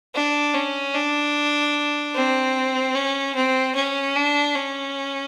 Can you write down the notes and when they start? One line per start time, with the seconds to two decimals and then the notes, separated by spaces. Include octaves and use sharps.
0.15 D4
0.54 C#4
0.94 D4
2.15 C4
2.95 C#4
3.35 C4
3.75 C#4
4.15 D4
4.55 C#4